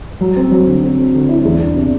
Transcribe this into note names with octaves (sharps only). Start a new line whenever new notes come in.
F#3
C4
F#3
D3
C4
C4
D3
E4
E2
D4
C3